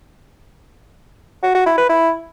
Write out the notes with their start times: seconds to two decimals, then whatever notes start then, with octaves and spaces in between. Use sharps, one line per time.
1.43 F#4
1.55 F#4
1.66 E4
1.78 B4
1.89 E4